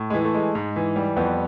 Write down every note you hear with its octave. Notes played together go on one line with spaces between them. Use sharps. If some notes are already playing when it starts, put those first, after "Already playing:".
Already playing: A2
G#3
E3
A3
G#3
G#2
E3
G3
F2 B3